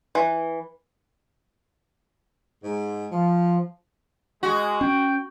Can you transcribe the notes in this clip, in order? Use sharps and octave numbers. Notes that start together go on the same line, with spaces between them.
E3
G#2
F3
G#3 F#4
C#4 G5